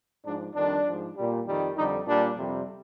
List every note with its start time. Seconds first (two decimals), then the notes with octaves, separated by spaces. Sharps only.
0.25 G#2 F3 D4
0.54 F2 D#3 G3 D4
0.85 G#2 F3
1.15 A#2 G3
1.45 F2 D#3 G3
1.75 F2 D3 G3 D#4
2.06 A#2 G3 D4
2.36 F2 C3 G3